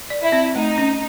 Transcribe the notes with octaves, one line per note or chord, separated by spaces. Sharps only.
D5
E4
C4
A3 D#4
C#4